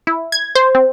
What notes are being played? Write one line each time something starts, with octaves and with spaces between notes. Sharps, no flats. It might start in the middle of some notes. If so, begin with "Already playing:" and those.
E4
G#6
C5
C4